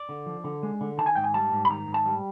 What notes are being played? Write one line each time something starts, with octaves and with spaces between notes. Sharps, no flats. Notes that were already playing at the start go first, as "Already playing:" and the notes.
Already playing: D5
D3
F3
D3
G#3
D3
D#3 A5
G#5
G#2 G5
G#5
G3 A5
G#2
B5
D#3 A#5
G#2
A5
G3